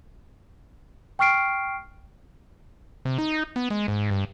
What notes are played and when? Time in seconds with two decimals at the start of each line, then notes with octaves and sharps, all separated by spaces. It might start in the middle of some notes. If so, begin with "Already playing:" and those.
1.19 G5 C#6 F6 C7 D7
3.05 C3
3.19 D#4
3.56 B3
3.70 G#3
3.88 G#2
4.10 G2